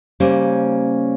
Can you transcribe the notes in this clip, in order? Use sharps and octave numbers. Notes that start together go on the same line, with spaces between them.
C#3 G3 A#3 C#4 C5